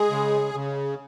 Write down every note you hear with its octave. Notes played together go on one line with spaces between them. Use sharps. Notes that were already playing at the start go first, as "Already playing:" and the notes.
Already playing: G#3 G#4
C#3
C#3